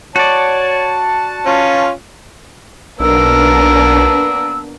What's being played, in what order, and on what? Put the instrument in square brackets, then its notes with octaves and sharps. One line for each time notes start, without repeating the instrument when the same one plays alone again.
[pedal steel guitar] F#4 D5 [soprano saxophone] C#5 [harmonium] A5
[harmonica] C#4 F4 [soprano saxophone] F5
[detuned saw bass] B1 [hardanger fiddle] A#3 A#4 [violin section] B3 D4 [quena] E6